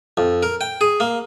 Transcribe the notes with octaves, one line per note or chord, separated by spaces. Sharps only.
F2
A#4
G5
G#4
A#3